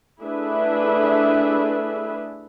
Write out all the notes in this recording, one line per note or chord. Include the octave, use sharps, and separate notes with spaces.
A3 D4 E4 G#4 B4 E5